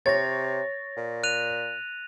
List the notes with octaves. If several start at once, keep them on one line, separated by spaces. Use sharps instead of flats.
C3 C#5 A6 A#6
A#2
F#6 D#7 F7